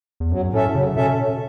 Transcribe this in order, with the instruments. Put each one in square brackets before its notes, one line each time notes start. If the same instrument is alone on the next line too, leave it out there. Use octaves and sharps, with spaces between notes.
[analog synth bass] E2
[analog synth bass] F#2 [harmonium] F#3
[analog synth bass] A2 [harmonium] C#4 A4 E5
[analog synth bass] C#3 [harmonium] F#3
[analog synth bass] B2 [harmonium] C#4 A4 E5